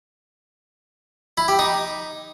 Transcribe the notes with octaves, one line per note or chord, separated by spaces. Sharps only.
E4
G4
D#4